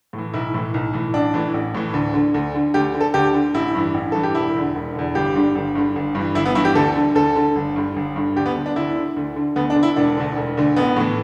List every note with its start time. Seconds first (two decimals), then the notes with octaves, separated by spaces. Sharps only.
0.13 A2
0.18 E3
0.34 B1 E4
0.54 A2 E3
0.74 B1
0.94 A2 E3
1.14 A1 D4
1.34 A2 E3
1.54 A1
1.75 A2 E3
1.94 D2
2.14 D3
2.34 D2
2.55 D3
2.74 D2 G4
2.94 D3
3.01 A4
3.14 D2 G4
3.34 D3
3.54 A1 E4
3.75 G2 E3
3.94 A1
4.12 G2 E3 A4
4.23 G4
4.35 E1 E4
4.55 E2 D3
4.75 E1
4.95 E2 D3
5.15 G1 G4
5.36 G2 D3
5.55 G1
5.75 G2 D3
5.96 G1
6.15 G2 E3
6.35 G1 E4
6.45 B3
6.55 G2 E3 E4
6.65 G4
6.75 D2 A4
6.95 D3
7.15 D2 A4
7.36 D3
7.56 G1
7.76 G2 D3
7.96 G1
8.16 G2 D3
8.36 D2 G4
8.46 B3
8.55 D3
8.66 D4
8.76 D2 E4
8.96 D3
9.16 D2
9.36 D3
9.56 D2 B3
9.70 D4
9.76 D3
9.83 E4
9.96 E1 D4
10.17 D2 D3
10.36 E1
10.57 D2 D3
10.76 A1 B3
10.97 A2 E3